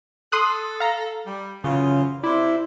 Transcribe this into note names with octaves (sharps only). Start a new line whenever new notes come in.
A4 C6 D#6 F#6
F5 A#5
G3
F#2 C#3 E3 F4
C3 E4 C5 D5